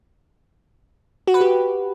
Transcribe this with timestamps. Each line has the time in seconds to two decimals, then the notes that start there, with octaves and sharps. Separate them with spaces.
1.27 F#4
1.34 B4
1.41 G4